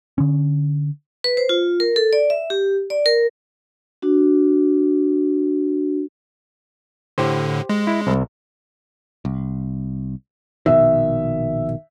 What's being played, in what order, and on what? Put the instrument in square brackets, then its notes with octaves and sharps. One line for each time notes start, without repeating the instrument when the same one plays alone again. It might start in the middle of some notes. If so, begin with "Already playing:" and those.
[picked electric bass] D3 C#4
[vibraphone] B4
C5
F4
A#4
A4
D5
E5
G4
D5
A#4
D4 F#4
[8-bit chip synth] A2 D3 [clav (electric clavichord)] G4 C5
[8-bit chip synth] G#3
[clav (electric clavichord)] E4
C2
[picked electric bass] C2
[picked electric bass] A#1 B2 D#3 [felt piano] E5